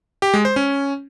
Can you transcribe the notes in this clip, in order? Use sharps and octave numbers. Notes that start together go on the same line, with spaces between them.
G4
G#3
C5
C#4